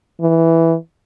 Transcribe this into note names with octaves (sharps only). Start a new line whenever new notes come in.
E3